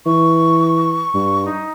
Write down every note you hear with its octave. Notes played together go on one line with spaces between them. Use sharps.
E3 C#6
G2
D#4